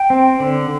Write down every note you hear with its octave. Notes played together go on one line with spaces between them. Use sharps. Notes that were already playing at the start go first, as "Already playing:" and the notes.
Already playing: G5
C4
D3